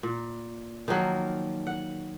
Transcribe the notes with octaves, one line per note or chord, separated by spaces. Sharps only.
A#2
D#3 F3 F#3 A#3
F#5